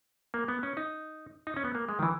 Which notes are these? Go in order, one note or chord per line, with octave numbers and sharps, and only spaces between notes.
A#3
B3
C#4
D#4
D#4
C#4
B3
A#3
G#3
D#3
E3